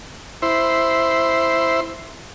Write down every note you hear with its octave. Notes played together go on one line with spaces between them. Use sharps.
E4 C5